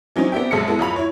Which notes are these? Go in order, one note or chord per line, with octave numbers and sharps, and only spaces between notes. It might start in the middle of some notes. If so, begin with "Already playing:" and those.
E3 F#3 C4 C#4 D#4
B3 C4 D4 G4 E5 G5
A#1 F#2 G#3 A4 E5 C#7
G#3 B3 E4 A4
F#2 F4 B5 F7
E4 C#5